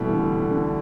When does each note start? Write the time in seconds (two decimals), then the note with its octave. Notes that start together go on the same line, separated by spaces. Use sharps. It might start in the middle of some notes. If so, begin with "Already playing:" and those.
Already playing: B2 E3 G3 A3
0.14 D3
0.33 B2
0.51 D3